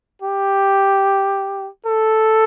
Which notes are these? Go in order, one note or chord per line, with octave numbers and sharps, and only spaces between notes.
G4
A4